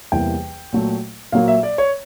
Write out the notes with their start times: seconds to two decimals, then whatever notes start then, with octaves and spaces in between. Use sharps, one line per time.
0.12 E2 C3 E3 G3 A#3 G5
0.73 A#2 F#3 A3
1.32 A#2 F#3 A#3 F5
1.48 E5
1.63 D5
1.78 C#5